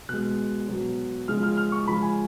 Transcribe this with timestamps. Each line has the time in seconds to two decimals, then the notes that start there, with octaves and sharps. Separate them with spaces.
0.09 B2 G#3 F#6
0.68 B2 F#3
1.28 C#3 F3 G#3 F6
1.43 F6
1.57 F6
1.72 C#6
1.87 C#3 F3 G#3 B5
2.02 G#5